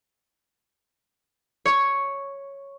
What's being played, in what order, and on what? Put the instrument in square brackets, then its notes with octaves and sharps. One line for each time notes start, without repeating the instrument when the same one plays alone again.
[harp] C#5